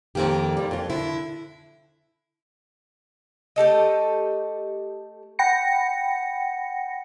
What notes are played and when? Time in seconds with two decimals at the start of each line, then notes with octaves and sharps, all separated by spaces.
0.15 F2 D#3 A#3 G4
0.57 G3
0.71 F2 F4
0.90 D3 E4
3.56 A3 G4 A4 D#5
5.39 F#5 G5 B5 A#6 C#7